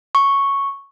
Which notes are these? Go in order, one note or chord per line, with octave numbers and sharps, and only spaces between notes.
C#6